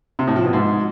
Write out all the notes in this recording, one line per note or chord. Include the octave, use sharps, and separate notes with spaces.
C3
A2
F3
B2
G#2